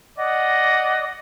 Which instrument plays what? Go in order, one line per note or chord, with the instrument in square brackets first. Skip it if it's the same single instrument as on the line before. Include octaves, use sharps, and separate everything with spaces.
[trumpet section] D5 D#5 F#5